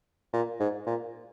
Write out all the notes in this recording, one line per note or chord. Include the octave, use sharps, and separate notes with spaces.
A#2
G#2
A#2